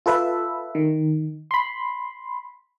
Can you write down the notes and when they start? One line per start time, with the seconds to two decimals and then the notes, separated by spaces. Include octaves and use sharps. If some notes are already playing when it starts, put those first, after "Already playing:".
0.06 F4 A4 B4 E5
0.75 D#3
1.51 B5 C6